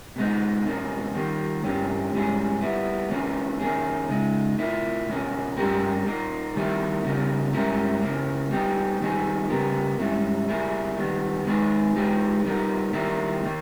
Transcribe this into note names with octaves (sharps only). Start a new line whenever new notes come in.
B2 G#3 D#4
E2 B2 A#3 C#4
D#3 G3 A#3
G2 E3 A#3 C#4 G4
G#2 E3 G3 C#4 G#4
G3 B3 E4
E3 A#3 C#4 G#4 B4
D#3 A#3 C#4 G#4
C#3 G#3 D#4
A#2 A#3 E4
E2 B2 A#3 C#4
G2 G3 C#4 G4 A#4
A#2 A#3 D#4 A#4
D#3 G3 A#3 E4
C#3 G3 A#3 D#4
G#2 G3 C#4 E4 A#4
C#3 E3 A#3
G3 B3 D#4 G4
D#3 G3 B3 D#4 G#4
C#3 G3 B3 G4 A#4
G#2 E3 G3 C#4 E4
G3 A#3 E4 G#4
D#3 G3 B3
D#3 G#3 D#4 G#4 B4
E3 G#3 D#4 G4 B4
G3 B3 D#4 A#4
D#3 G3 A#3 E4 A#4
D#3 A#3